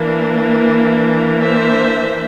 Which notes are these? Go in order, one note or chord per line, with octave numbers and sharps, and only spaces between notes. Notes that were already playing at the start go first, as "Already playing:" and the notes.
Already playing: E3 A#3 D4
C5 E5